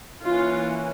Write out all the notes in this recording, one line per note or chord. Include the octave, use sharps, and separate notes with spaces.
E3 A#3 C#4 F4